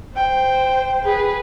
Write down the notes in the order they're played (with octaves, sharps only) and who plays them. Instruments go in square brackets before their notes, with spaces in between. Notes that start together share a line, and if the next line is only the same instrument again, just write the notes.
[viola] C5 [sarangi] G5
[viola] G#4 B4